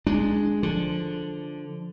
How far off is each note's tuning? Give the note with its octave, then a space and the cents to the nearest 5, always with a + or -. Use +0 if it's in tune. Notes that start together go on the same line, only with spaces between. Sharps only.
G#3 +0 D4 +0
D3 +0 F3 +0